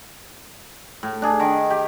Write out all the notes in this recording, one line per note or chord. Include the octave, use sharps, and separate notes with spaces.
A2
D4 G#4
D#3
G4